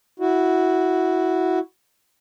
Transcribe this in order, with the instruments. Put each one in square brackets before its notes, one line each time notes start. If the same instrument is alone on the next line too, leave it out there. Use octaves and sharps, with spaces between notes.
[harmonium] E4 F#4